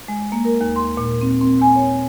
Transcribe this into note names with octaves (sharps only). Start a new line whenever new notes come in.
G#3
A#3
A#4
D#2
C6
A#2
C4
C4
G#5
C#5